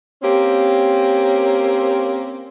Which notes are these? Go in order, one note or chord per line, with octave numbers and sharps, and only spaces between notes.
A#3 C4 C#4 G4